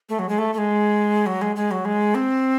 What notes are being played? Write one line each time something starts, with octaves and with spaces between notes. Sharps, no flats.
A3
F#3
G#3
A3
A3
G#3
F#3
G#3
G#3
F#3
G#3
C4